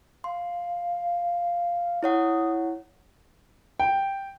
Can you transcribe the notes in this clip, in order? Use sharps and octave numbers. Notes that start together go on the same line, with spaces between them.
F5 C6
E4 C#5 F#5 D#6
G5